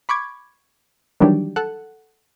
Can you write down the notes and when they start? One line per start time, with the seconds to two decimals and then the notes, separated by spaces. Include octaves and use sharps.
0.09 B5 C#6 D6 G#6
1.20 D#3 E3 F#3 G3 D4 G4
1.56 A4 F#5